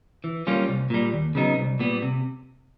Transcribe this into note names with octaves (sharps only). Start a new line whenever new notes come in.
E3
G3 A#3 C#4 F4
C2
A#2 G3
D#2
C#3 F#3 B3 D#4
C2
A#2 G3 B3
C3